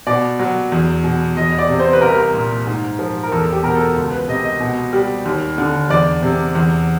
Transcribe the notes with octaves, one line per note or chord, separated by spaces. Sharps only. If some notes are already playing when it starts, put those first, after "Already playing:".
B2 D5
F#3
E2
B2
E2 D#5
D5
C3
C5
B4
C2 A#4
A#2
G#2
F3
A#4
E2 A4
G4
B2 A#4
A4
C#2
B4
C3 D#5
D#5
B2
G3
D#2
D3
E2 D5
C3
E2